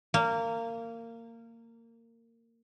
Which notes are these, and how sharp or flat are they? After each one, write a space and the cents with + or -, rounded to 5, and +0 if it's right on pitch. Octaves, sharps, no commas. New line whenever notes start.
A#3 -20